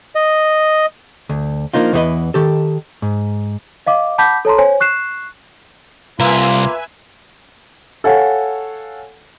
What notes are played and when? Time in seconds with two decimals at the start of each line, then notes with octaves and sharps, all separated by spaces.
0.15 D#5
1.29 D2
1.74 F3 F#3 A#3 D4 D#4 F4
1.93 E2 E3 B3 D#4 B4 D#5
2.34 D#3 G4 A4
3.02 G#2
3.86 D#5 F5 D6
4.18 F#5 A5 B5 D6 G6 B6
4.45 A4 C#5 A5 A#5 C6
4.58 C5 C#5 G#5
4.80 C#6 F#6 C7 E7
6.20 C2 A#3 F4 B4 E5 G#5
8.04 A4 C#5 F5 F#5 G#5